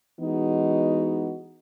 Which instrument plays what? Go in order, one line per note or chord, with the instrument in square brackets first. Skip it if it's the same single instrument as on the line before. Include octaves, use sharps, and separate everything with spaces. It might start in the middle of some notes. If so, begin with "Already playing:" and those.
[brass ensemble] E3 G#3 B3 D#4 F#4